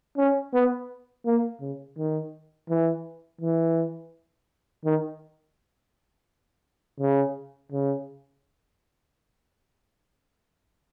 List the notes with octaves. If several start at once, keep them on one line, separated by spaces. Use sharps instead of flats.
C#4
B3
A#3
C#3
D#3
E3
E3
D#3
C#3
C#3